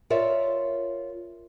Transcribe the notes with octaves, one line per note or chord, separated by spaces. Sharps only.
F4 A#4 C#5 D5 E5